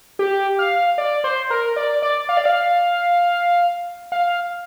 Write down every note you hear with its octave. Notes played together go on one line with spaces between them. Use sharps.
G4
F5
D5
C5
A#4
D5
D5
F5
D5
F5
F5